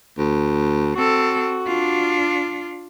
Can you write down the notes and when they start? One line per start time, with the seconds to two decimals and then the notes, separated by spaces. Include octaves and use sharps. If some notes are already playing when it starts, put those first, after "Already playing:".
0.18 D2
0.95 C4 F#4 A4
1.67 D4 F4